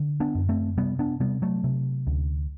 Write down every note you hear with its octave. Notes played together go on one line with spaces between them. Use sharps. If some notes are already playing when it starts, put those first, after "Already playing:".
Already playing: D3
B3 D4
F#2
A3 C4
C3 G3 B3
B3 D4
C3 G3 B3
F#3 A3
C3
D2